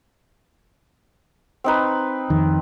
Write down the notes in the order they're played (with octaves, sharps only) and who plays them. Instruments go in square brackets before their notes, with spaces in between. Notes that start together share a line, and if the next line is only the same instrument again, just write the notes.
[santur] C4 D#4 B4
[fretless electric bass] F2 D#3